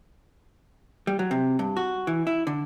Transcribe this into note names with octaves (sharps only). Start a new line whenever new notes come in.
G3
F#3
C3
G2
F#4
E3
E4
D3